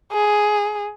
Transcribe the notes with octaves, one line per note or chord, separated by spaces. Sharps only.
G#4